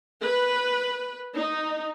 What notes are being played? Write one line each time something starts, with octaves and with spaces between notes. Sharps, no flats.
B4
D#4